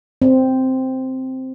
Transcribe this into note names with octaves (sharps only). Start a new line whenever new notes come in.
C4